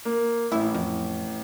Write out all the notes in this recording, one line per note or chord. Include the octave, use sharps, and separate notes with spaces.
A#3
A1 E4
F2